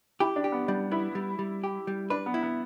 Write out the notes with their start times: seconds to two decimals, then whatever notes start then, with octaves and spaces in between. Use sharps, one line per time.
0.20 E4 G4
0.36 D4
0.44 G4
0.52 B3
0.68 G3 D4
0.91 B3 E4
1.15 G3
1.39 G3
1.64 G4
1.87 G3
2.10 D4 B4
2.26 B3
2.34 E4
2.43 B3